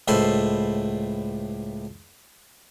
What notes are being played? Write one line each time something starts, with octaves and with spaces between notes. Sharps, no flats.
C#2 A2 A4 B4 C5